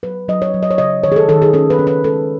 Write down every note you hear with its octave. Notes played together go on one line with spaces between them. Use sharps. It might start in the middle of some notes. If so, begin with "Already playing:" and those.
F#3 B4
F#3 D#5
C#5
F#3
D#5
C#5
C#3 D#5
D#3 C#5
G#4
A4
D#3 A4
G#4
C#4 A4
B4
C#4
B4
G#3 A4